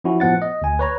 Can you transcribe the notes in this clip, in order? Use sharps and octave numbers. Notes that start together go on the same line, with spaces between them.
F3 C#4 E4 F#4
A2 F3 B3 F#5 A6
D#5
D2 G#5
B4 C#5 A#5